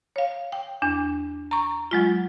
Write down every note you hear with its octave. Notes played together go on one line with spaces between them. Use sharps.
C#5 F5
G5
E2 D4
A#5 C#6
F#3 G#3 F4